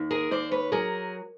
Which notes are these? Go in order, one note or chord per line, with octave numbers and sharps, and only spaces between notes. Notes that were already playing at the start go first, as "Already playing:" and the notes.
Already playing: D#2
G#4 A#4
D#2 C5 D5
B4 C#5
F#3 G#4 A#4